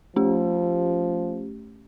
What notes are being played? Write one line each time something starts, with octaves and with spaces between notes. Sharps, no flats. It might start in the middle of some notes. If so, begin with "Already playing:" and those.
F3 A3 C#4 G4